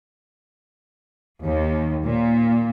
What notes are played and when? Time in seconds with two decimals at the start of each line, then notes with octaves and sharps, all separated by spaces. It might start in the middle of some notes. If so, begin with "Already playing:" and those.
1.44 D#2
2.04 A#2